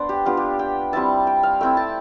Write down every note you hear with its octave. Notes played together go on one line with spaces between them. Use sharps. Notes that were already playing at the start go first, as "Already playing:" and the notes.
Already playing: B3 D4 C5 D5
G4
B3 D4 F4 G4
G4
G5
G3 C4 E4 A5
G5
F5
A3 C4 E4 G5
A5